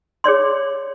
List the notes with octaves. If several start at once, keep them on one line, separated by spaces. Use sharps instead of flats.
G#4 C#5 D5 C6